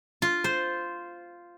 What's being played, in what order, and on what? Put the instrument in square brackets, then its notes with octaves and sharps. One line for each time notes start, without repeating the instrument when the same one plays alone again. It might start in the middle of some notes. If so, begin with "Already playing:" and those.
[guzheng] F4
C5